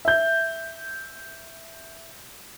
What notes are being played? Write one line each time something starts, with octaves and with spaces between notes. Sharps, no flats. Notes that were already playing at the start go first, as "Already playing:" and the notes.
E5 G6